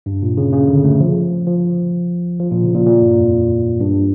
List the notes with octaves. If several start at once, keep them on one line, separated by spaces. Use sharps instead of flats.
G2
A#2
C#3
C#3
D3
A3
F3
F3
F3
A#2
C#3
A#2
A#2
G2
F2
G2